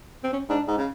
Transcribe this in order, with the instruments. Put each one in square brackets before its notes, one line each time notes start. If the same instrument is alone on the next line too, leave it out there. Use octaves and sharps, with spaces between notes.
[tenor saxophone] C4
C#4
[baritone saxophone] G#2 [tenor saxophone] D4
[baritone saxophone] G#2
C#3